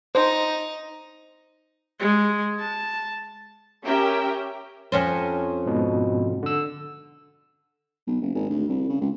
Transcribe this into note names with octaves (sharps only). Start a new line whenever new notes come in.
D#4 C5
G#3
A5
C#4 G4 A#4 E5 G5
F2 C#4 C5
G#2 B2
D3 E6
B1
F#1
G#1
D2
C2
C#3
C#2